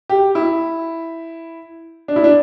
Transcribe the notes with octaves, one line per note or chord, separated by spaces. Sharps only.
G4
E4
D4
E4
D4